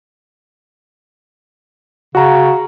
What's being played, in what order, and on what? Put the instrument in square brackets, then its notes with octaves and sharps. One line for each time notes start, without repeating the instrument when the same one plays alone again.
[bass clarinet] C#3 [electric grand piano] F#4 A#5